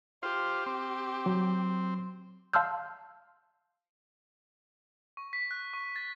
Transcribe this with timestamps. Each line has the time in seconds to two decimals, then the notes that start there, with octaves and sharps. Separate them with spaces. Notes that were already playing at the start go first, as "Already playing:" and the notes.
0.23 F4 G4 C5
0.66 C4
1.26 F#3
2.53 F5 A5 C6 E6 F6 G6
5.17 C#6
5.33 B6
5.51 F#6
5.73 C#6
5.96 A6